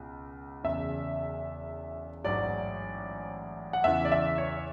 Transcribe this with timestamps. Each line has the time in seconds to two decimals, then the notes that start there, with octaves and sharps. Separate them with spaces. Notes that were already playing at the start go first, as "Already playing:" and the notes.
Already playing: C#2 B2
0.64 E1 E2 C#3 E5
2.24 A1 G#2 F#3 D5
3.73 F#5
3.84 E2 C#3 E3 E5
4.05 D5
4.12 E5
4.38 C#5